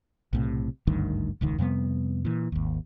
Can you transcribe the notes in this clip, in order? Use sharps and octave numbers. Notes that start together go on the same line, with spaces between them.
B1 A2 C3
G#1 D2 G2 D#3
D#1 C#2 D#3
F2 C3 G3 B3
A#2 E3
G#1 D#2